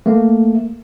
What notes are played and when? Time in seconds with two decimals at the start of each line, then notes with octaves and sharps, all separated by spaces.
0.06 A3 A#3